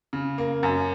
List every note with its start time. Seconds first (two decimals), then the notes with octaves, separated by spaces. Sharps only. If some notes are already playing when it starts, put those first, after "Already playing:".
0.13 C#3
0.38 A#3
0.63 F#2